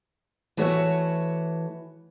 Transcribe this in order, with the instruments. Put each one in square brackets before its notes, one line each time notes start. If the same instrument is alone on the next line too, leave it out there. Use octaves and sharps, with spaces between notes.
[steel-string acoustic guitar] E3 A3 F#4 C#5 E5